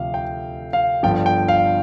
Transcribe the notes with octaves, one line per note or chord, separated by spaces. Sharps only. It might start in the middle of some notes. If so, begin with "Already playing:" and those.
Already playing: D2 C3 F3 F5
G5
F5
G1 G2 F3 G5
G5
F5